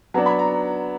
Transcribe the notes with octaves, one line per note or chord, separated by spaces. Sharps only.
F#3 B3 D4 A#5
B5
A#5